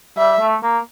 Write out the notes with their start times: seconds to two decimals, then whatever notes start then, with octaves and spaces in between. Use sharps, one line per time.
0.17 G3 E5
0.40 A3
0.63 A#3